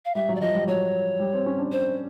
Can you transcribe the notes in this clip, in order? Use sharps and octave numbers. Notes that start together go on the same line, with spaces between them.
F5
G3 E5
F#3
D5
F3 D#5
G3
F#3 C#5
G3
C4
C#4
D4
C5